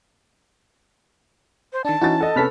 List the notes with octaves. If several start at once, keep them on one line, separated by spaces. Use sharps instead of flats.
C5
D#3 D4 A5
E3 C#4 D#4 F#4 A6
A4 D#5 F#5
C3 B3 C#4 A4 F6 B6